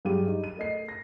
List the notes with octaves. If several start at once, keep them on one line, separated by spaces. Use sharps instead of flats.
G2 F#3 G#3 G4 D#7
D#4
D#7
A3 D#5 C7
A#6